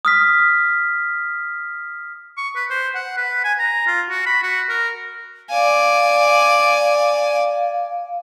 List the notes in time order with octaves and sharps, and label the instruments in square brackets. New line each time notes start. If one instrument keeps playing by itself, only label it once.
[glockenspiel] D#6 F6 B6
[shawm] C#6
B4
C5
F#5
B4
G#5
A#5
F4
F#4
B5
F#4
A#4
[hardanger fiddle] D5 G#5 [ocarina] F5